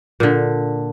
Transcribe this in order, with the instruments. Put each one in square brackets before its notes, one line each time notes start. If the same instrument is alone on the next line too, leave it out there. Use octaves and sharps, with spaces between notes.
[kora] A#2 D3